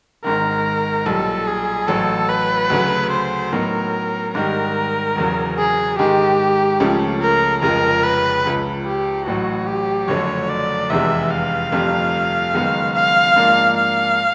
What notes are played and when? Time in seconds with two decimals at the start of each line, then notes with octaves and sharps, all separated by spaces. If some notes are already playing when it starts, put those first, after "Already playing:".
0.24 G#1 G#2 D#3 A#4
1.06 B1 A#2 G3 A4
1.48 G#4
1.88 A1 A2 F#3 A4
2.29 B4
2.70 D2 C#3 F#3 A3
3.11 C5
3.53 A2 F#3 B3 D#4 A#4
4.34 G#2 D#3 G3 A#4
5.16 E1 E2 C#3 F#3
5.58 G#4
5.98 G#2 D#3 G#3 G4
6.80 C#2 C#3 F3 A3 C#4
7.22 A#4
7.62 F1 F2 C#3 F3 G#3 A#4
8.03 B4
8.44 C#2 C#3 F3
8.85 G4
9.26 A1 A2 F#3 F#4
9.67 G4
10.08 F#1 F2 D3 F#3 A3 C#5
10.49 D5
10.90 F1 E2 C3 E3 G#3 E5
11.31 F5
11.72 G1 F2 C3 F3 A3
12.54 F#1 F#2 D#3 G#3 B3
12.95 F5
13.36 G#2 F3 A#3 D4
13.77 F5